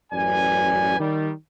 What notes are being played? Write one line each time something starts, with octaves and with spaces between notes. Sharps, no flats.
A1 F#2 B4 D5 G#5
D#3 G3